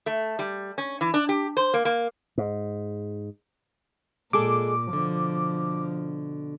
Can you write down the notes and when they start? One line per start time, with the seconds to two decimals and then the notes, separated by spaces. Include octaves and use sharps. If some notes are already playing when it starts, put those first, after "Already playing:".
0.06 A3
0.39 G3
0.78 C#4
1.01 E3
1.14 D4
1.29 G4
1.57 C5
1.74 A#3
1.85 A#3
2.38 G#2
4.33 A#2 G#3 G#4 A4 D6
4.93 B2 D3 F3